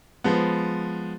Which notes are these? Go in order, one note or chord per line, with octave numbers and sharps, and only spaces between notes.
F3 G#3 B3